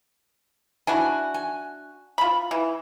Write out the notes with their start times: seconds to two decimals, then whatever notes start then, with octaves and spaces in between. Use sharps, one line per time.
0.87 D4 E4 F#4 G#5
1.34 G#5
2.18 F4 B5
2.51 E3